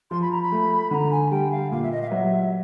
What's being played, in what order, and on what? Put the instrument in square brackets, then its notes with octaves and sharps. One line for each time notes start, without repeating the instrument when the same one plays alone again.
[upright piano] F3 [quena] C6
[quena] B5
A#5
B5
[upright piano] A3
[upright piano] D3 [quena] A#5 B5
[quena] G#5
[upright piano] G3 [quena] G5
[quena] F5
[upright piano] A#2 [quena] F5
[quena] E5
D#5
F5
[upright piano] F#3 [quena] E5